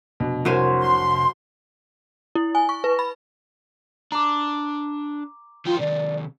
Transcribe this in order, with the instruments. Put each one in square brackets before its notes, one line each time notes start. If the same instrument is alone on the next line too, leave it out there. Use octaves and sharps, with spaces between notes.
[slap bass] F1 D4 [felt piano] B2
[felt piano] C2 A#4 [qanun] F#3 C5 G#5
[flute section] C6
[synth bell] E4
G#5
C#6
B4
B5
[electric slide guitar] D4 [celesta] A#5 D6
[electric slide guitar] D#3 F3 G5 [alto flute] F4
[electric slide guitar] C3 D#3 [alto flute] D5